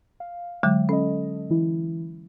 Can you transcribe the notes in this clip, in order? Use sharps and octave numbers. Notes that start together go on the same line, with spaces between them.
F5
D3 F#3 G#3
C#4 A4 D#5
E3 E4